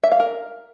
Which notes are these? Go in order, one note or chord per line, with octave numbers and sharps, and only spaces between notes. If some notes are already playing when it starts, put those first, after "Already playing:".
E5
F5
A#4